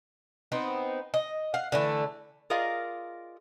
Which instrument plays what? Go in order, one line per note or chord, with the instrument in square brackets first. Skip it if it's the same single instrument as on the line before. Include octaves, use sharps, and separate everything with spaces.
[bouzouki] B3 C4 D#4
D#5
F5 F#5
D3 E3 A3
[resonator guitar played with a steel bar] F4 G#4 A#4 D5 D#5 F5